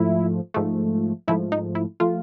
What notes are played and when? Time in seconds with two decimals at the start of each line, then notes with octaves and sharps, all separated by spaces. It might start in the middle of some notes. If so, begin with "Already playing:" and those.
Already playing: G#2 F3 A3 E4
0.54 G#2 F3 A3
1.28 G#2 F3 A3 E4
1.52 D#4
1.75 E4
2.00 F3 A3 F4